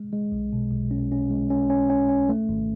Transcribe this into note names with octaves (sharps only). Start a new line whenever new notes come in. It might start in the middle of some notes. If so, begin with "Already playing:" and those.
Already playing: G#3
G#3
B1
B2
B1
C#4
C#4
G#3
C#4
C#4
C#4
C#4
A3
G#1